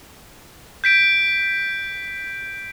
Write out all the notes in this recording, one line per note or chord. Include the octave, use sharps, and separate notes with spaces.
G6 B6 D7